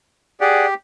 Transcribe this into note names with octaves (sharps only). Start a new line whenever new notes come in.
G4 G#4 D5 F#5